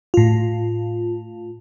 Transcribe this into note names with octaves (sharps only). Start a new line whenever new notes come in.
A2 F4